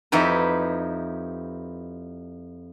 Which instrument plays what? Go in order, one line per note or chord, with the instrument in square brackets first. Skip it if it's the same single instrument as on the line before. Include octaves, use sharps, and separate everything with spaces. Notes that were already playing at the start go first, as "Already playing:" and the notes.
[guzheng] F2 D#4 E4 G4 B4